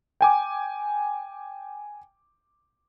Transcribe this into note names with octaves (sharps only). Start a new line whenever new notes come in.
G5 G#5 D6